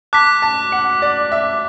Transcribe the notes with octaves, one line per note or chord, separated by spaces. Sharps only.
A5 D6 F#6 B6
A5
F#5
D5
E5